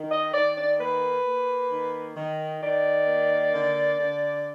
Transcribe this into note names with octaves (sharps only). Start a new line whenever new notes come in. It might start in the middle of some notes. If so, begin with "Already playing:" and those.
Already playing: D#3
D#5
D#3 D5
D5
A#3 B4
A#3
D#3
D#3
D#3 D5
A#3
D3
D3